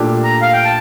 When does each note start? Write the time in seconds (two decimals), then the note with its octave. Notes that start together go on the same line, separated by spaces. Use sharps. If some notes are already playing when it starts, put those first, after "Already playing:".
Already playing: A#2 A3 D4 G4
0.24 A#5
0.42 F5
0.53 G5
0.64 A5